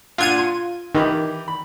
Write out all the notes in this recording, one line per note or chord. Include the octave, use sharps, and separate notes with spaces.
A#2 D4 F4 F#5 G#6 D#7
C6
D#3 E3 G4 B5
B5